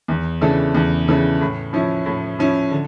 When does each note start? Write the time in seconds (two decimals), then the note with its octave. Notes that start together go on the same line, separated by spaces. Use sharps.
0.08 E2
0.41 C#3 E3 A3 D4
0.75 E2
1.08 C#3 E3 A3 D4
1.41 A2
1.73 F3 C#4 E4
2.06 A2
2.39 F3 C#4 E4
2.71 D3